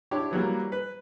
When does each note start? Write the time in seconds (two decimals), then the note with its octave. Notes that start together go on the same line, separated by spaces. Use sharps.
0.11 D4 E4 G4 C#5
0.31 E3 F#3 G3 A#3
0.72 B4